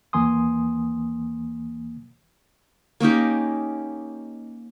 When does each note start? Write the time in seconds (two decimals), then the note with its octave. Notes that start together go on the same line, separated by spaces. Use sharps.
0.13 D#2 E3 A#3 G#5 C6 D#6
3.00 A#3 C#4 D#4 G4